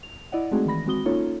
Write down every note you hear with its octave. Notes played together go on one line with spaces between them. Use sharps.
F7
E4 D5 D#5 F#5
G#3 A3 C4 D#4 F#4 G#4
D#3 E3 B5 A#6
G#3 C4 F#4 D#6 G7
A#3 C#4 D#4 F4 A4 C#5